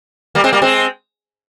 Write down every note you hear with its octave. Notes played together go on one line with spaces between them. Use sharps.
G3 A#3
G#3 C4
G3 A#3
G#3 C4